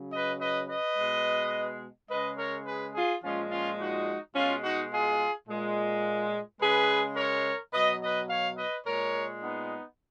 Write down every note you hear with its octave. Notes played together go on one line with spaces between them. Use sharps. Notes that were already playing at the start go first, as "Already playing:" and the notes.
Already playing: C#3 F#3
B4 D#5
B4 D#5
B4 D#5
B2 G#3
C#3 G#3 B4 D#5
A#4 C#5
G#4 B4
F4 G#4
A#2 F3 G#3 C#4 F4
C#4 F4
D#4 F#4
B2 G#3 C#4 F4
D#4 F#4
F4 G#4
A#2 G#3
C#3 G#3 G#4 B4
A#4 C#5
B2 F#3 B4 D#5
B4 D#5
C#5 F5
B4 D#5
A#2 G#3 A#4 C#5
B3 D#4